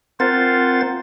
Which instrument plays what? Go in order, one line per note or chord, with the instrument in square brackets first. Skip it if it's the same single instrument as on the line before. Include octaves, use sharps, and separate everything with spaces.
[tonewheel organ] C4 A#4 F#5 [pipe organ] F4 C5 A6